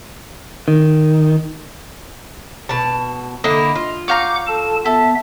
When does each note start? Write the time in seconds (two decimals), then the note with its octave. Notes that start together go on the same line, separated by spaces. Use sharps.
0.68 D#3
2.69 B2 A5
3.44 D3 A#3 E4 D#5
3.75 F4
4.08 C#5 F5 F#5 A#5 D6 G6
4.47 A4 A5
4.86 B3 A4 E5